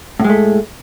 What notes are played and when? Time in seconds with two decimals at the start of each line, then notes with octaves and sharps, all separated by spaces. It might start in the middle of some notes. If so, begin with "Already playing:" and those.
0.20 A2
0.24 G#3
0.29 A3